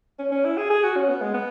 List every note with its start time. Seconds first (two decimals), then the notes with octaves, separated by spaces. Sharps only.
0.19 C#4
0.32 C#4
0.45 E4
0.57 G#4
0.70 G#4
0.83 F#4
0.96 C#4
1.09 B3
1.21 G#3
1.34 B3